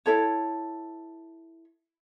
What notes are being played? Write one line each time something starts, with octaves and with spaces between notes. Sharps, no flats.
E4 A4 C#5